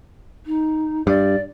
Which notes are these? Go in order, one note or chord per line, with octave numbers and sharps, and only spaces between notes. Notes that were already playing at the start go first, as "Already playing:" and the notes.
D#4
G2 D5